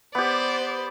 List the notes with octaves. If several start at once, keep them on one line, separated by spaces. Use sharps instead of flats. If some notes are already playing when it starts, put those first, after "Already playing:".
B3 G4 C5 D5